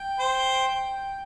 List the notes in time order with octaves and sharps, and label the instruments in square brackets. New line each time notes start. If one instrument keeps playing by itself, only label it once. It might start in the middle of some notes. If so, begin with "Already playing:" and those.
Already playing: [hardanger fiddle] G5
[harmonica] C5